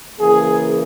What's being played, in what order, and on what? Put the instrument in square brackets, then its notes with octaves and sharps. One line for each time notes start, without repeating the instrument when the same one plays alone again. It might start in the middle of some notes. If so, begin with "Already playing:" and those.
[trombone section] C#3 E3 A#3 G#4